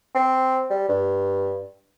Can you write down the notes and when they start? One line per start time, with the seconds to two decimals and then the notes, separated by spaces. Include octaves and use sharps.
0.16 C4
0.70 G3
0.89 G2